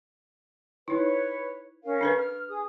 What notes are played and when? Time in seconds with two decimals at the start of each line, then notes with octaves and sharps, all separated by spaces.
0.88 D#4 E4 B4 C#5
1.84 C#4 A#4 F5
2.01 D4 A4 B4
2.17 F6
2.49 G#4 D#6